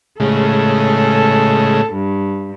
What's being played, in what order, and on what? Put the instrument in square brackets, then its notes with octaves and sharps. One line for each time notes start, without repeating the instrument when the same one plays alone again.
[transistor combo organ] A2 C#3 G#3 [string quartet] A4
[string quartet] G2